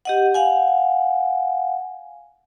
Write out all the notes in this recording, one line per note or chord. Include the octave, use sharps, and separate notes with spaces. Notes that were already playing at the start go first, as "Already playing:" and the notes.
G4 D#5 F#5
F5 F#5 G#5